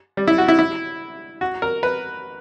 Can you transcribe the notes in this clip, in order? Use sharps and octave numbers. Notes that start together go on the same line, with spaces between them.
G3
E4
F#4
E4
E4
F#4
A#4
B4